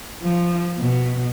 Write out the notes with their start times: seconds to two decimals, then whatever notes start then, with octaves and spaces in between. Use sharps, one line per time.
0.23 F3
0.79 B2